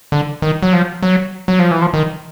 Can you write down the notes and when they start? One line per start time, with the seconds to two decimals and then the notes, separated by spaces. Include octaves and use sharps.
0.12 D3
0.42 D#3
0.63 F#3
0.73 F3
1.03 F#3
1.48 F#3
1.59 F3
1.71 E3
1.82 F3
1.94 D#3